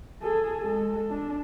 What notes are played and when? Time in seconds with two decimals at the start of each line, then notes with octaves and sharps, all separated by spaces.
0.22 G#4 A4
0.61 G#3 A4
1.10 D4